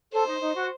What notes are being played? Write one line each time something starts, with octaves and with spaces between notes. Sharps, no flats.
A4 C5
D#4
D#4
F#4